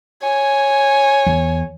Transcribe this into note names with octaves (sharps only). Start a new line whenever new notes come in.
C#5 G#5
E2